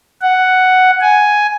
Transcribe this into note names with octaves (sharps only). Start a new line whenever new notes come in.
F#5
G#5